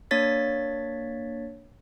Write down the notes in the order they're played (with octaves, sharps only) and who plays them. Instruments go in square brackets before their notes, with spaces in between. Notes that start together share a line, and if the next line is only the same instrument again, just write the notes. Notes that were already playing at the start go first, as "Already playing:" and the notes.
[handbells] A#3 D4 C#5 A6 B6